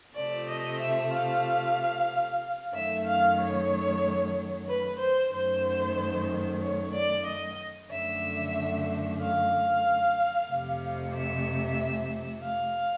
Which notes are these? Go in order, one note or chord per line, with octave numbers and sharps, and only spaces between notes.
C3 F3 A3 D5
D#5
E5
F5
F#2 D#3 F#3 A3 E5
F5
C#5
B4
C5
F#2 D#3 F#3 A3 C5
C#5
D5
D#5
F#2 D3 F3 A3 E5
F5
F2 C3 F3 A3
E5
F5